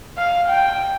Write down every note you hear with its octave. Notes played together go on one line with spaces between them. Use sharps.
F5
G5